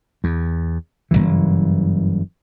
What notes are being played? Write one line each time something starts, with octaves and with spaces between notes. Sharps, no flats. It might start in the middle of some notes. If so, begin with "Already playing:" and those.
E2
F#1 B1 G2 E3